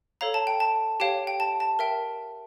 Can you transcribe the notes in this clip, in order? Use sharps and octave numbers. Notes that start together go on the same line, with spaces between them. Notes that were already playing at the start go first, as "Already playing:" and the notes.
A4 C#5 F5 A#5
A5
G5
A5
G4 C#5 F5 G5
G5
A5
A5
A#4 E5 G5